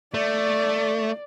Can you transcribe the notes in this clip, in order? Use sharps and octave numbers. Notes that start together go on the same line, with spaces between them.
A3 D5